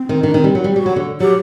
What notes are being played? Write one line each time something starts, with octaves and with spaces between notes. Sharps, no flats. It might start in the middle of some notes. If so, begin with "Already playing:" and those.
Already playing: C4
D#3
D#3 D4
D#3 C4
G3
F#3
G3
G4
G3 F#4
F#3
D3
F#3 G4